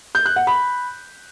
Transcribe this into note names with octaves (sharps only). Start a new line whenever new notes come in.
G6
F#6
F#5
B5